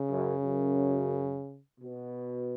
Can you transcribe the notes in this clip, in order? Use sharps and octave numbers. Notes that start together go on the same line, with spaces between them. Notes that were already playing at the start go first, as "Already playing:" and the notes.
Already playing: C#3
F#2
F#2
B2